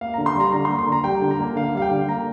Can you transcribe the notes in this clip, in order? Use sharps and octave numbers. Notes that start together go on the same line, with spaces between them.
A#3 F5
D3 A#5
C6
G3 A#5
D3 A#5
C6
A#3
C6
D3 A#5
G3 G5
D3
A#5
A#3
D3 F5
G3 F5
G5
D3
A#3 A#5